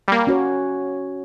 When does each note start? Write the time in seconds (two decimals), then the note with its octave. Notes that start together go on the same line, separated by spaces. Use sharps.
0.08 G3 A#3
0.27 C#4 F#4 C#5